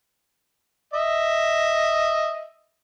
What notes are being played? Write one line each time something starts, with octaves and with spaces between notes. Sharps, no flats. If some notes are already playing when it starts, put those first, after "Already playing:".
D#5 E5